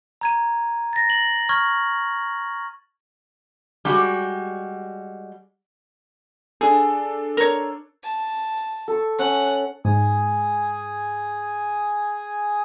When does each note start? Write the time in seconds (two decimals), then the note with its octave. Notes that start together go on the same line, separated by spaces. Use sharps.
0.21 A#5 G#6 D#7
0.93 A6 A#6
1.10 F#7
1.49 C#6 F6 G#6
3.85 G3 G#3 F#4
6.61 D4 G#4 A4
7.37 A#4 C#5
8.04 A5
8.88 A4 C#6
9.19 C#4 F#5 F#6
9.85 G#2 G#4 G#5 D#6